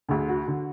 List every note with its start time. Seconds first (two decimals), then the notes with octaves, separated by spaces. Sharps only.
0.09 D2 D3 G#4
0.29 F#4
0.48 D3